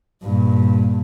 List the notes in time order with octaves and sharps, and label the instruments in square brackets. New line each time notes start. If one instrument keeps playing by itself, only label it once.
[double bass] G2 A#2